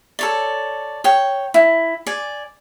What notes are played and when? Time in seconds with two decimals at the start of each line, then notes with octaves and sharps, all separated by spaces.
0.19 A4 C#5 D5
1.04 C#5 G5
1.54 E4
2.07 D5 G#5